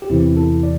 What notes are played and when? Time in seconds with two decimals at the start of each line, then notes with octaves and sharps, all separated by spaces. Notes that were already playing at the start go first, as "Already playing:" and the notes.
0.02 G4
0.10 E2 C3 E3 C4 E4
0.37 E4 A4
0.63 D5